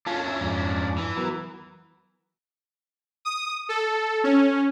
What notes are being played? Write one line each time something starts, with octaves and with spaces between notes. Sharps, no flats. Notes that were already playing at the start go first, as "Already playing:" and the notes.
C#4 D4 F4 A4
E5
F2 G#2 D5
E3
F#3 B3 A#4
D#6
A4
C#4